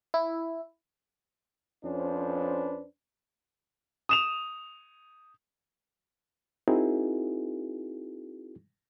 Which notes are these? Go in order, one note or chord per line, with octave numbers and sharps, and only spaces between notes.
E4
F2 C#4 D4 B4 C5
D#6 E7 F7
C4 D#4 E4 F#4 G#4 A#4